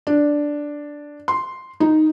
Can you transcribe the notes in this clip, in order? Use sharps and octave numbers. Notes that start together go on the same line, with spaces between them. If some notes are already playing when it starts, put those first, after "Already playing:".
D4
C6
D#4